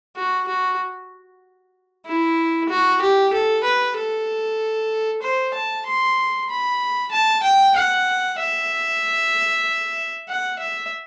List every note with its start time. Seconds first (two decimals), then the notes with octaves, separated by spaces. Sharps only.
0.16 F#4
0.48 F#4
2.06 E4
2.69 F#4
3.02 G4
3.33 A4
3.64 B4
3.97 A4
5.22 C5
5.54 A5
5.86 C6
6.50 B5
7.12 A5
7.43 G5
7.76 F#5
8.39 E5
10.29 F#5
10.60 E5